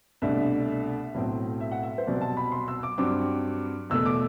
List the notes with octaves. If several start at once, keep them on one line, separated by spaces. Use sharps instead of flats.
C2 B2 A3 D4 E5
B1 A2 F#3 C4
E5
F#5
E5
C5
C2 B2 F#3 C4 D5
A5
B5
C6
E6
D6
G2 F#3 C4 D6
E2 B2 A3 E6
D6